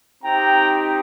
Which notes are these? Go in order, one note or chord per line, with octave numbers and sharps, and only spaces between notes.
C4 D#4 G4 G5 A#5